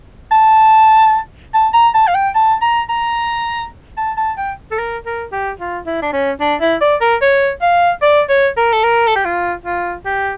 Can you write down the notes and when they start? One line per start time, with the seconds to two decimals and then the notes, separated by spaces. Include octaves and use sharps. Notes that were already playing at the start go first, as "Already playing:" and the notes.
0.32 A5
1.54 A5
1.74 A#5
1.95 A5
2.08 F5
2.15 G5
2.35 A5
2.62 A#5
2.89 A#5
3.97 A5
4.17 A5
4.38 G5
4.71 A4
4.79 A#4
5.06 A#4
5.33 G4
5.60 F4
5.86 E4
6.02 D4
6.13 C#4
6.41 D4
6.61 E4
6.81 D5
7.01 A#4
7.22 C#5
7.62 F5
8.02 D5
8.29 C#5
8.57 A#4
8.73 A4
8.84 A#4
9.07 A4
9.16 G4
9.25 F4
9.65 F4
10.06 G4